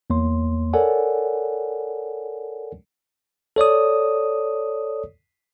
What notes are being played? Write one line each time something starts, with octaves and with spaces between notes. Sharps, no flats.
E2 A#3 C#5 C6
A4 A#4 C#5 D5 F#5 G#5
A4 C#5 D5 D#6